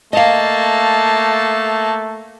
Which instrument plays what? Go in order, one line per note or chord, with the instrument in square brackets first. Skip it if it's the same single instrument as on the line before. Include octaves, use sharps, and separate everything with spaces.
[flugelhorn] A3 [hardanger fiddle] A#3 A5 [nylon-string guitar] D#5 F5